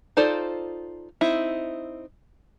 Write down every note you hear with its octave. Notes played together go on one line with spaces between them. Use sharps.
D#4 F4 A4 C5 D5
C4 D#4 E4